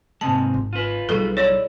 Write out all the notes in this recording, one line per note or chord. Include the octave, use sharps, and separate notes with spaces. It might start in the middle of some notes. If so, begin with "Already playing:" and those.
G#2 C3 G#3 A5
G#1
F4 B4
B1 G3 G#4 A4
E4 C#5 D5